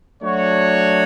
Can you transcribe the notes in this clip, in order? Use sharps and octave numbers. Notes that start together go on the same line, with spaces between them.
F#3 A3 D4 F#4 C#5